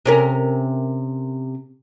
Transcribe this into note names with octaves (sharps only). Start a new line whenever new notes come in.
C3 C#4 A#4